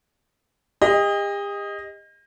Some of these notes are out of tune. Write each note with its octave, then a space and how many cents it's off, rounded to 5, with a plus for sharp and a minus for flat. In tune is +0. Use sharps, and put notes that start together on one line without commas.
G4 +45 D#5 +0